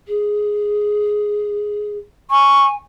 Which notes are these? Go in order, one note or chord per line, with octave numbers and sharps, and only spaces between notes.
G#4
G#5 C#6